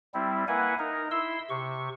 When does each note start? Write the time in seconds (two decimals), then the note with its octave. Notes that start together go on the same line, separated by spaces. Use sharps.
0.14 G3 C4 E4
0.48 A#3 E4 B4 F#5 G#5
0.79 D#4 A#4
1.11 E4 C6 E6
1.50 C3 C#6